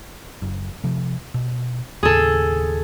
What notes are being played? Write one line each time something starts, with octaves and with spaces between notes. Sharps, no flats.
F#1
C3 F3
B2
D#2 A2 C#3 G#4 A4